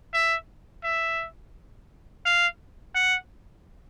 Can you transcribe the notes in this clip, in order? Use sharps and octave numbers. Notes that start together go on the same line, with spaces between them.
E5
E5
F5
F#5